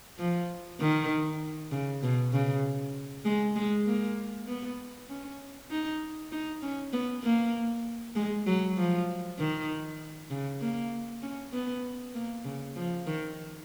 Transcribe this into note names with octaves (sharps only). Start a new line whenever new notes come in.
F3
D#3
C#3
B2
C#3
G#3
G#3
A#3
B3
C#4
D#4
D#4
C#4
B3
A#3
G#3
F#3
F3
D#3
C#3
A#3
C#4
B3
A#3
C#3
F3
D#3